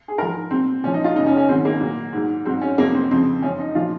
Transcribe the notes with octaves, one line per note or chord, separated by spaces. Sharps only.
G#4
G#2 F3 A#4
A#2 F#3 C4
A#2 F3 C#4
D#4
F4
F#2 C#3 F#3 D#4
C#4
C#4
G#2 D#3 F#3 C4
A#3
A#2 F#3
G#2 F#3
G#2 F#3 C4
C#4
F2 C3 F#3 A#3
C4
F2 C#3 F3 C4
F#2 F3 C#4
D#4
A#2 F3 F4